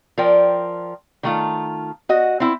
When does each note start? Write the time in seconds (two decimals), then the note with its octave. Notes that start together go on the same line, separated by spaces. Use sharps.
0.18 F3 A#4 D5 G5
1.23 D#3 A3 F4
2.09 F#4 D#5
2.40 C4 E4